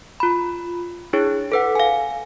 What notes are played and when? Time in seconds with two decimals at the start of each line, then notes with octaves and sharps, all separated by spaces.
0.20 F4 B5
1.13 D4 E4 G#4 C#5
1.52 A4 B4 F#5
1.75 F5 G#5